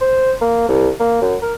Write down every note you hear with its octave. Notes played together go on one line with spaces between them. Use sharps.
C5
A#3
C2
A#3
F#2
A#4